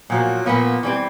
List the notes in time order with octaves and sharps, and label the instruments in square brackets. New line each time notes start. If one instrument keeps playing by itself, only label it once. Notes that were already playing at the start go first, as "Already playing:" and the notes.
[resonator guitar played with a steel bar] A#2 F3 A#3 [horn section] F#3
[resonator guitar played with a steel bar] A#2 F3 A#3 [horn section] B3
[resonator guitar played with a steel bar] E3 G3 C4